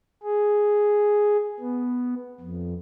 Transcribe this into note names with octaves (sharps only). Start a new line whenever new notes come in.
G#4
B3
F2